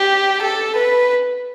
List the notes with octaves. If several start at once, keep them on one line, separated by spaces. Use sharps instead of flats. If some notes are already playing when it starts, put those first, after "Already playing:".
Already playing: G4
A4
B4